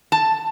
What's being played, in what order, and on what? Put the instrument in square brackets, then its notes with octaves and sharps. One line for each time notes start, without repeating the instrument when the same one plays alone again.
[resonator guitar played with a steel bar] A5